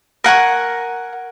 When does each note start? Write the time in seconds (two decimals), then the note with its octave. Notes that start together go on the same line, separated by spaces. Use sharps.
0.24 A#4 F#5 G#5 C#6